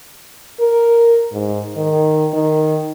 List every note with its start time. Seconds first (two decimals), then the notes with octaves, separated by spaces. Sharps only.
0.60 A#4
1.33 G#2
1.77 D#3
2.34 D#3